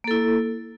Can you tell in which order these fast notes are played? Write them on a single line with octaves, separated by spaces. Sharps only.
A#3 A4 E4